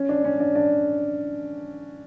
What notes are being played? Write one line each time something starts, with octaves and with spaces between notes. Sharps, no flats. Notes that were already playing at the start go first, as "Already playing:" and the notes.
Already playing: C#4
D4
C#4
D4
D4